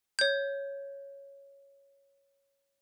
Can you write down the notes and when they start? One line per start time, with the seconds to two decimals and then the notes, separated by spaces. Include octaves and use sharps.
0.19 C#5 G6